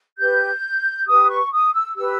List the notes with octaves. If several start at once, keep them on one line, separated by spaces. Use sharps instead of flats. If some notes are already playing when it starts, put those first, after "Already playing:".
G4 B4 G6
G4 B4 D#6
C#6
D#6
E6
G4 B4 E6